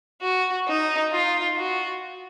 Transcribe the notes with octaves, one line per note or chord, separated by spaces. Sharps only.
F#4
D#4
F4
F#4